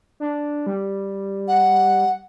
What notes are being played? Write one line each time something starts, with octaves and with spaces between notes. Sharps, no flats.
D4
G3
F#5